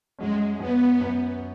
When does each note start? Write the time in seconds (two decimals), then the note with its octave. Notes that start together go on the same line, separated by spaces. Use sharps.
0.18 F#2 F#3 G#3 C#4
0.59 F#2 F#3 B3 C#4
1.01 F#2 F#3 C#4